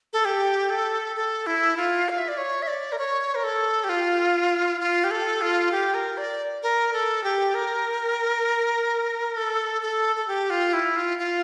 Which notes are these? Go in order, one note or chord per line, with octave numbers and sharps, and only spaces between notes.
A4
G4
A4
A4
E4
F4
F5
E5
D5
C#5
E5
D5
A#4
C#5
A#4
A4
G4
F4
F4
G4
A4
F4
G4
A#4
D5
A#4
A4
G4
A#4
A4
A4
A4
G4
F4
E4
F4
F4